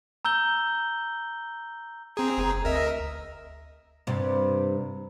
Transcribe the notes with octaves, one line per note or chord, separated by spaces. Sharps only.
A#5 E6 G6 G7
C4 G#4 A#5
F#1
D2 A#4 D#5 E5
G2 C3